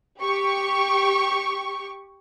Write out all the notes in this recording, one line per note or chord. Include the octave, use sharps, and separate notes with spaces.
G4 C#6